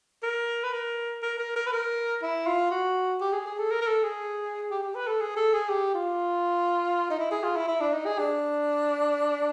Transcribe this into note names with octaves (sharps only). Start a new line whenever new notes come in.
A#4
B4
A#4
A#4
A#4
A#4
B4
A#4
E4
F4
F#4
G4
G#4
G#4
A4
A#4
A#4
A4
G#4
G4
G4
B4
A4
G#4
A4
G#4
G4
F4
D#4
E4
G#4
F4
E4
E4
D4
D#4
G#4
D4